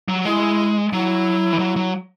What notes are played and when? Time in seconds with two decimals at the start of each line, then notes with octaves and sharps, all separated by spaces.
0.08 F#3
0.25 G#3 E4
0.93 F#3 E4
1.53 E3
1.59 F#3
1.76 F#3